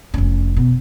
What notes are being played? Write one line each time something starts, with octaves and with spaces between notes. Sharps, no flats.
F1 C#4
B2